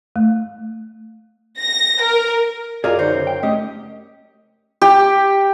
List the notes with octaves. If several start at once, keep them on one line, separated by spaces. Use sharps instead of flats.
A3
A#6
A#4
F#2 F4 G#4 A#4 D5 D#5 A#5
D3 D#4 F#4 C5
C#3
G5
A3 C#4 G4 D#5
G4